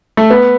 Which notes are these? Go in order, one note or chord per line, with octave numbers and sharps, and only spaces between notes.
A3
B3